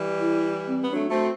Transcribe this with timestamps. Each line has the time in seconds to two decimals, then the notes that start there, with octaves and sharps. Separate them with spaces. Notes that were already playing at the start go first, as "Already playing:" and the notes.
Already playing: E3 G3
0.21 E4
0.67 C4
0.81 B3
0.91 F#3 A3 D4
1.09 A3 C4 F#4